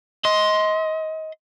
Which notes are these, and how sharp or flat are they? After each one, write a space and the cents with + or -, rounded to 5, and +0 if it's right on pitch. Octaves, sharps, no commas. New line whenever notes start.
D#5 +25 C6 +0